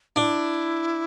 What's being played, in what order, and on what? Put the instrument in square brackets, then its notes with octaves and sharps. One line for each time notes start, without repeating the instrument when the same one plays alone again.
[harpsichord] D4 [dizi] E4